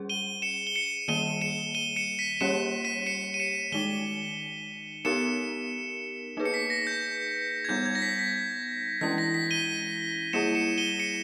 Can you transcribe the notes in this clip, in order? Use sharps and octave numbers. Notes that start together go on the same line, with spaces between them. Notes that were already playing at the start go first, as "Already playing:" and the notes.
Already playing: G3 C#4 G#4
D#7 G7
C#7 E7
G7
C#7 E7
D#3 G3 A#3 D#7 G7
C#7 E7
D#7 G7
C#7 E7
B6 D#7
G3 A#3 C#4 G4 C#5 C#7 E7
B6 D#7
C#7 E7
D#7
C#7 E7
D#3 G#3 D#4 D#7 G7
B3 D#4 G4 A#4 C#7 E7
A#3 D#4 G#4 B4
C#7
B6
A#6
G6
G#6
G3 B3 D#4 G6
G#6
A#6
B6
B6
E3 G#3 C#4 E4 B6
A#6
B6
D#7 G7
G3 A#3 E4 G#4 C#7 E7
C#7 E7
D#7 G7
C#7 E7